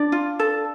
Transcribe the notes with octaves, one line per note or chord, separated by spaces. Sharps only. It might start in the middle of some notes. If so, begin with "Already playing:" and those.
Already playing: D4 D5
F4
A4